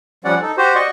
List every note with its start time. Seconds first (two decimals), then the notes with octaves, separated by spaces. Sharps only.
0.24 F3 G3 C#4 D5 F#5
0.41 D#4 A4
0.57 F#4 G4 C5
0.75 F#4 D5 D#5 C#6